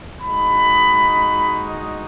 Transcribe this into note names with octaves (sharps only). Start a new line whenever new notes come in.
G#3 D#4 F#4 B5
D#5